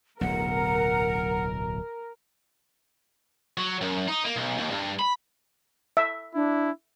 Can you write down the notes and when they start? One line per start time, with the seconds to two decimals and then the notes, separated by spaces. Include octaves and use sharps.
0.21 D1 B1 A#4 F#5
3.58 F#3
3.81 F#2
4.08 D#4
4.24 A#3
4.36 B1
4.58 D#2
4.71 G2
4.99 B5
5.97 E5
6.35 D4 E4